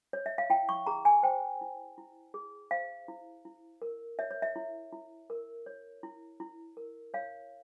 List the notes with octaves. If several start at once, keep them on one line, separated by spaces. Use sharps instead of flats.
C#5
E5
F5
E4 G5
C#6
G#4 A#5
G#5
C5 G5
E4
E4
G#4
C5 F5
E4
E4
A#4
C#5 E5
C#5
E5
E4
E4
A#4
C#5
E4
E4
A#4
C#5 F5